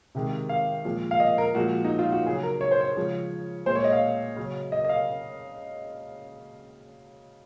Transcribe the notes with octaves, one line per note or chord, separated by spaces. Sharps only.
C3 D#3 G#3
F5
A#2 F3 G#3
F5
D#5
A#4
A#2 F3 G#3 F#4
D#4
F4
F#4
C#3 F#3 G#4
A#4
C#5
C5
C#5
C#3 F3 G#3
A#2 G#3 C5
C#5
D#5
F5
C#3 F#3
D#5
D#5
F5